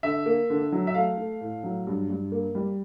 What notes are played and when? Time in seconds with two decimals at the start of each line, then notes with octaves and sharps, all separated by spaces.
0.03 D3 E5
0.26 A#3
0.50 D3
0.72 F#3
0.87 E5
0.95 A3 F5
1.17 A3
1.41 A2
1.64 F#3
1.87 G2
2.10 G2
2.32 A#3
2.55 G3